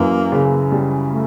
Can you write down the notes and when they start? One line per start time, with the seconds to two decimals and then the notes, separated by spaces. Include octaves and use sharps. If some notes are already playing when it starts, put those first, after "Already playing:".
Already playing: F#2 E3 A#3
0.32 C#3
0.72 G3
1.11 A3